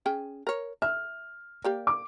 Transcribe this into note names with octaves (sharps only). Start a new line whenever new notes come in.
C#4 G#4 G5
A#4 C#5
E5 F6
A#3 G4 D5
D6